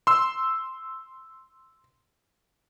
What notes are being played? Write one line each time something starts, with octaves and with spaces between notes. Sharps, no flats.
C6 E6